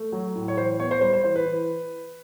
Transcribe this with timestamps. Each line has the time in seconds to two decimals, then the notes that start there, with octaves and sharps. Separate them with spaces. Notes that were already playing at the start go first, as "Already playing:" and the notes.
Already playing: A3
0.12 F#3
0.35 A2
0.48 C#5
0.57 E3 C5
0.80 B3 C#5
0.91 C5
1.01 G3 C5
1.13 C5
1.24 E3 C5
1.36 B4
1.46 E3